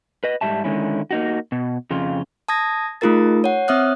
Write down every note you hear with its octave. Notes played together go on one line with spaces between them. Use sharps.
B4 D#5
G#2 G3 E5 A5
D3 D#3 G#3 C#4 E4
A#3 D#4 F#4
B2
F2 C#3 F4
A5 D#6 G#6 A#6
A3 D#4 F4 G#4 A#4 A6
C#5 F#5
C4 C#5 E5 D#6 F6 F#6